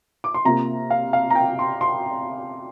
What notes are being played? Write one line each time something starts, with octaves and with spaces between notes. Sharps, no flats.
D6
C6
C3 A#3 F4 A#5
F5
F5
A#5
G5
C6
C6